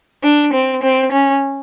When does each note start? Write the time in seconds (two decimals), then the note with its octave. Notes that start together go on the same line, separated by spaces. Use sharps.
0.23 D4
0.53 C4
0.82 C4
1.12 C#4